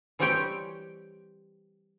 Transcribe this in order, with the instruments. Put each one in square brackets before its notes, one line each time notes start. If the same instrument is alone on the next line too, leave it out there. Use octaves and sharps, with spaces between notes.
[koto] E3 G3 C4 G4 C#5 G5